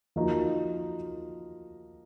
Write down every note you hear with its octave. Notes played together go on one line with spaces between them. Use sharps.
F3 A#3 D#4 F#4 A#4